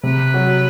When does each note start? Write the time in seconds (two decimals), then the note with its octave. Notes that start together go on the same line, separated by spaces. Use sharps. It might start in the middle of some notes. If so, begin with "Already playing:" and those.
0.03 C3 B4
0.34 F#3